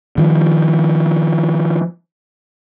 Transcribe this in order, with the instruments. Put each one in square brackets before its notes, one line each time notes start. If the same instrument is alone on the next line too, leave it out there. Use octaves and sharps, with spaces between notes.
[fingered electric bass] D#3 F3 G3